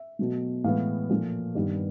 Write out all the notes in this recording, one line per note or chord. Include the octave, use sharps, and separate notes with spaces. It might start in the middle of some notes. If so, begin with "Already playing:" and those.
Already playing: E5
B2 F#3 A3
A2 E3 G#3 B3 F5
A#2 F3 A3
G2 D#3 G3 B3